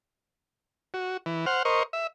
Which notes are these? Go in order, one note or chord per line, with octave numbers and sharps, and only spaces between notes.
F#4
E3
C5 F#5 F6
A#4 C5 D#5 C#6
E5